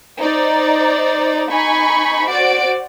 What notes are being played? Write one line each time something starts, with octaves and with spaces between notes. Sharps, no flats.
D#4 C5 D5
D#4 G#5 B5 C#6
F#4 C5 D5 D7